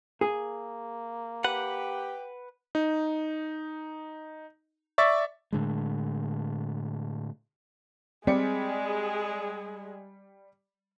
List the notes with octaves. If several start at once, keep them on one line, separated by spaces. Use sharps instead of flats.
A#3 G#4
G4 B4 F#5
D#4
D5 E5 C#6 A6
A2 D3 G#3
G3 G#3 C4 G#4 D5 C#7